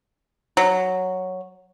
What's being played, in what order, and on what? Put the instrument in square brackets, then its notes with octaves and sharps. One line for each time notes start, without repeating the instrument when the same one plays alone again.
[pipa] F#3